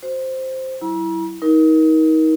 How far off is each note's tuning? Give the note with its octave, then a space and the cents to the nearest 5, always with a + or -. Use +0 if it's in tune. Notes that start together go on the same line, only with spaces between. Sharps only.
F#4 +0 C5 +0
F#3 +30 E4 +0 A#5 +45
D#4 +30 A#4 +20